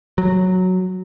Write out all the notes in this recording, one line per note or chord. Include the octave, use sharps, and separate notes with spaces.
F#3